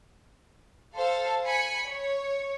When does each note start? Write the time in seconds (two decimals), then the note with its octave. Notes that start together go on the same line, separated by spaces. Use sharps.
0.95 A4 C5 F5
1.44 G#5 B5 C#7
1.88 C#5